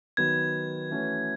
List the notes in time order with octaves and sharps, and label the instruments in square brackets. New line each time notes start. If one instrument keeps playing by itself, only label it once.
[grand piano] D#3 F#3 B3 [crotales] G#6
[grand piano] E3 A3 C#4 F#4